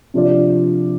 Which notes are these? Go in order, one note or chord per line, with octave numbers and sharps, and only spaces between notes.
C3 F3 D4 F4 D5